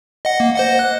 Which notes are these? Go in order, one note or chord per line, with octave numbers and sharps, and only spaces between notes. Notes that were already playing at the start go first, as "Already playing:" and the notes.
D#5 F#5
A#3
C5 D#5 F#5
F#6